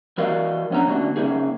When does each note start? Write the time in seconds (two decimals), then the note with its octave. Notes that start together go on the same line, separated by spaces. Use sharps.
0.18 E3 F#4 A#4 D5 D#5 F5
0.70 F2 B3 C#4 D4 A#5
0.87 D3 A#3 C#4 D4 F#4
1.16 C#3 A#3 C#4 D#4 G#4